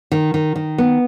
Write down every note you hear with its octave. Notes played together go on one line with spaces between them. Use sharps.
D#3
D#3
D#3
B3